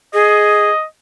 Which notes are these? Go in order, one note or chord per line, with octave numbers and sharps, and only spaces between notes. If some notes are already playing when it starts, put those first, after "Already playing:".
G#4 D#5